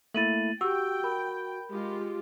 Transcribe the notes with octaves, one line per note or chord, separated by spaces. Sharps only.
A3 A#3 E4 A6 D#7 F#7
F#4 G4 G5 E6
A#4 B5
G#3 F4 G4